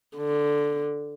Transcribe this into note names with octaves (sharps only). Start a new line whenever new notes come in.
D3